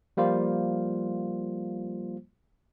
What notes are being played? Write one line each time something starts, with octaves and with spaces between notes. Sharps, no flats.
F3 G3 A#3 F4 C5